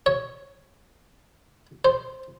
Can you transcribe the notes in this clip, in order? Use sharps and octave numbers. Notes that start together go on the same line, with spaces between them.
C#5
C5